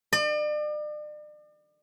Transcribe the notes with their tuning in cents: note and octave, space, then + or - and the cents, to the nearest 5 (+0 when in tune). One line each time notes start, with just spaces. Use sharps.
D5 +40